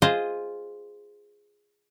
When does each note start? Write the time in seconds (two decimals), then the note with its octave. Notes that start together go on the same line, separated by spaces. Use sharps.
0.02 F4 G#4 C5 D#5